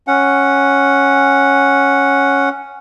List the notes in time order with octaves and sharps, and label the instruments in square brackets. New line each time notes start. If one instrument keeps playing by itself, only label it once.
[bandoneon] C#4 F#5